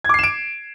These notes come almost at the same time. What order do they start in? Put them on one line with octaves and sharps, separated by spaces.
G#6 D6 C7 E7 D7